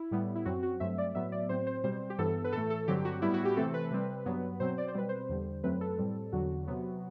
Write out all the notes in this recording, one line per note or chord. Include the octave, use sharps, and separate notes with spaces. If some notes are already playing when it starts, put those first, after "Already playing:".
Already playing: E4
A2 G3 B3
E4
F#2 F#3 C4 F#4
F#4
G2 F#3 A3 C4 E5
D5
A2 F#3 B3 E5
D5
A2 F#3 C4 C5
C5
B2 G3 C4 C5
G4
G2 E3 B3 A4
B4
A2 E3 A3 A4
A4
G2 D3 F#3 C4 G4
F#4
A2 G3 B3 E4
F#4
G4
C3 E3 A3 C4 A4
B4
C3 G3 C4
G2 F#3 B3
B2 F#3 C4 C5
D5
C5
B2 G3 C4 B4
C5
E2 D3 G3
F#2 F#3 A3 C4 B4
A4
A2 G3 C4
E2 D3 F#3 F#4
C3 F#3 B3